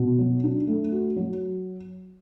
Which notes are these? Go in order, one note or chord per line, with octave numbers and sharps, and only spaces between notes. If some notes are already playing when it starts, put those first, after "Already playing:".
Already playing: B2
F#3
D4
A3
F#4
F#3